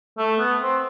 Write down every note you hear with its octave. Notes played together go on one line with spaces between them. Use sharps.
A3
B3
C4